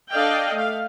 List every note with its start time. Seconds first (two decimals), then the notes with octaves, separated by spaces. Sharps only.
0.11 D4 A4 D5 D#5 F5 G5
0.54 A3 F5